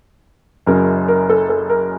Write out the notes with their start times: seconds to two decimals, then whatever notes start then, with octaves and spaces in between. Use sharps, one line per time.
0.66 F#1 F#2 C#3 F#3 A#4
1.08 A#4
1.29 A4
1.49 A4
1.70 A#4